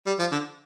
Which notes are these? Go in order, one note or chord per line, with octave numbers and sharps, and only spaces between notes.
G3
F3
D3